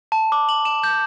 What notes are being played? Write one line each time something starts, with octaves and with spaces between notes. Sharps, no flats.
A5
D6
F#7
E7
G6